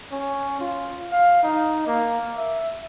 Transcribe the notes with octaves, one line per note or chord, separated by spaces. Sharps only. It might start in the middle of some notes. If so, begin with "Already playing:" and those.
C#4
F4
F5
D#4
A#3
E5